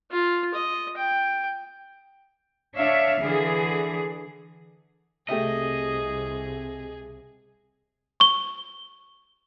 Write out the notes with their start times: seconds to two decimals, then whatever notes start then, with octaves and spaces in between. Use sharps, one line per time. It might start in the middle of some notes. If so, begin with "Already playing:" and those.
0.11 F4
0.54 D#5
0.97 G5
2.76 D4 C#5 E5 F5
3.20 D3 E3 G#4
5.29 C2 C3 A3 G4 G#4 D#5 E5
8.20 C#6 G7